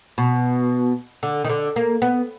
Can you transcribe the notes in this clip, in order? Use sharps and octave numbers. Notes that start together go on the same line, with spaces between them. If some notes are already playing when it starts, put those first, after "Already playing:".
B2
D3
D#3
D3
A#3
B3